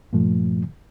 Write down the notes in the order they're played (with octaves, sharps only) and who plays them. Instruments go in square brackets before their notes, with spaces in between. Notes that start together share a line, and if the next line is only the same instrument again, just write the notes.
[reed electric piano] G2 A#2 F3 A3